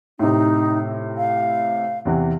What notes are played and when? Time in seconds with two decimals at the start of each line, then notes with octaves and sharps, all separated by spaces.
0.19 A2 C3 D#4
1.18 F5
2.05 E2 C3 E3